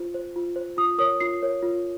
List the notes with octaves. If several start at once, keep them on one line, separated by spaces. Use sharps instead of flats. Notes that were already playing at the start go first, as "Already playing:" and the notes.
Already playing: F4 C5
C5
F4
C5
F4 D#6
A#4 C#5 D#6
F4 C7
A#4 C#5
F4